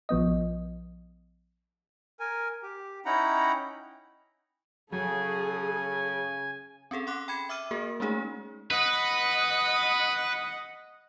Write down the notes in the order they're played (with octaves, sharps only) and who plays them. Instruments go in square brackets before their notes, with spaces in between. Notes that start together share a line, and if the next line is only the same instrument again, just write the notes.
[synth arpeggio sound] A#1 F3 B3 D#5
[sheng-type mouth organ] A#4 G#5
G4
C#4 D#4 E4 F#5 G5 A#5
[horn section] C#3 [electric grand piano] F#3 [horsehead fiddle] G#4 A4 [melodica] G#5
[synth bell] C4 C#4 G#4 A4
F#5 C6 D6 F#6
G5 B5 G#6 C#7 E7
E5 D6 E6 F6 D#7
A#3 F#4 G#4 A#4
G#3 A3 C#4 D#4 G#4
[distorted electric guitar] B4 [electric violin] D#5 F#5